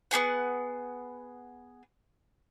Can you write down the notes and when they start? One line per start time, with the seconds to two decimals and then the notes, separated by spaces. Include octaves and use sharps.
0.11 B3 C#4 G#4 F#5